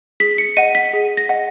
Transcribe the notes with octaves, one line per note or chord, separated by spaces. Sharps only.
G#4 B6
C#7
D#5 F#5 D#7
B6
G#4
A#6
D#5 F#5